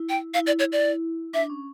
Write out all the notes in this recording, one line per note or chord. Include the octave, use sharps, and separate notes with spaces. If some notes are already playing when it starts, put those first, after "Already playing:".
Already playing: E4
G5
E4 F5
D5
C#5
D5
D4 E5
C#4